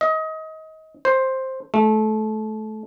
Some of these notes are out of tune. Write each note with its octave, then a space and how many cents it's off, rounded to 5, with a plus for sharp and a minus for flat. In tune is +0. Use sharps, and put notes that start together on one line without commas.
D#5 +25
C5 +10
A3 -25